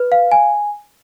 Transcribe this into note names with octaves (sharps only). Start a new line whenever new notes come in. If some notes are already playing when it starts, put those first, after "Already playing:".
Already playing: B4
F5
G#5